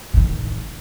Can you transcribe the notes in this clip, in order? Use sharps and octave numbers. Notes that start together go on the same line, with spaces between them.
A2 D#3